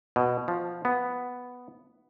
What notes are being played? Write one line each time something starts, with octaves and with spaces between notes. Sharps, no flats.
B2
F3
B3